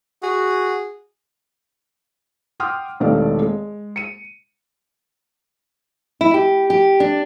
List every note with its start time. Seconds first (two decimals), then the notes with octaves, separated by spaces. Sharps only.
0.23 F#4 G#4
2.60 F#5 G5 C6 D6 D#6 F6
3.00 E1 C3 D#3 A3 D5 F5
3.42 G#3
3.96 C#7 D#7
6.21 E4
6.34 G4
6.70 G4
7.00 D4